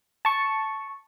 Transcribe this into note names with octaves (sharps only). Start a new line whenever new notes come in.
A5 C#6